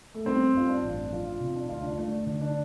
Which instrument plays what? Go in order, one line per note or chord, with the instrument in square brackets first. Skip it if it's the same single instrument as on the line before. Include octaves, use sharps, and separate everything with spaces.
[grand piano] A3
[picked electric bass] G3 [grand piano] C4
[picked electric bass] G2 [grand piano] F4
[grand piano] D4
[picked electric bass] A1
[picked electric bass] F3 [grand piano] F4
[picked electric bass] C3
[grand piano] D4
[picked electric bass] D2 [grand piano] F4
[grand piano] D4
[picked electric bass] A3 [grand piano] D4
[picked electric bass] D3
[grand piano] D4